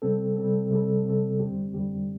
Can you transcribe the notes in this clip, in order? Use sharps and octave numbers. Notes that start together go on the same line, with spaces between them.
C3 G3 C4 A4
C3 G3 C4 A4
C3 G3 C4 A4
C3 G3 C4 A4
F2 D3 G3 C4 G4
F2 D3 G3 C4 G4